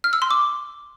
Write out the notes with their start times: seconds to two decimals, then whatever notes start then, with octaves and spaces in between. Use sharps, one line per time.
0.04 F6
0.13 E6
0.22 C6
0.31 D6